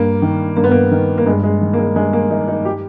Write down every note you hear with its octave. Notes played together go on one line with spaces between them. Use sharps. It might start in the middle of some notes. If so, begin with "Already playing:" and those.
Already playing: G2 A#3
D#3
G2 A#3
B3
A#3
D#3
A#3
G2 G#3
G#3
D#3
A#3
G#3
G2 G#3
A#3
D#3 D#4
D#4
G4